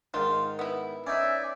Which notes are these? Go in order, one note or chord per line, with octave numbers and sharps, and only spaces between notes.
G#2 D#3 F4
B3 E4
C#4 D#4 D5 E5 G#5